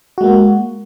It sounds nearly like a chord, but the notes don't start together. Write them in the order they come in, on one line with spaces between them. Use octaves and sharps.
F#4 G#3 A#3